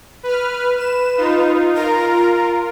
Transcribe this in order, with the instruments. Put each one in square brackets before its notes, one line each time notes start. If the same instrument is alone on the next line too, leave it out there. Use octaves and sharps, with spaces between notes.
[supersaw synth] B4 F6
[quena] B4 [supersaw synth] E7
[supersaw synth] D#4 F4
[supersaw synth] F4 A#4 [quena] A#5